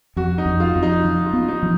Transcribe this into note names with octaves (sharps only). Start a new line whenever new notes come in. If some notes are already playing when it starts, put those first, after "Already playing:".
F2 F#4
D#4
F2
F4
F2
D#4
F3
F4
B3
D#4
F3